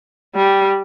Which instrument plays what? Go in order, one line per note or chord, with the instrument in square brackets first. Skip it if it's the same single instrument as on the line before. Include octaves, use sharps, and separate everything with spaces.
[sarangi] G3